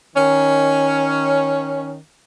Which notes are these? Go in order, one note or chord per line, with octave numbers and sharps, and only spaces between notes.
D#3 C#4